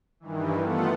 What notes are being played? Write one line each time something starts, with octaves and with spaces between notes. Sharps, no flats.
G2 D#3 E3
A3 B3 F4 A4 F#5